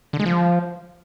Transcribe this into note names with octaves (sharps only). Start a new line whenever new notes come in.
D3
G#3
F3